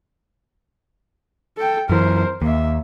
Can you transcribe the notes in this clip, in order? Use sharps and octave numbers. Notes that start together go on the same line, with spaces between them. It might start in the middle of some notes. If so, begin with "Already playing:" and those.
A4 G5
F#2 E3 A#4 C5
D#2 A#3 E5